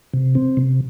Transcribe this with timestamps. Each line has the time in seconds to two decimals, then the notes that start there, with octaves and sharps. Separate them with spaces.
0.14 C3
0.35 C4
0.57 C3